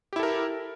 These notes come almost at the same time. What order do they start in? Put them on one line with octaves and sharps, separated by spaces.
G4 E4 A4 A#4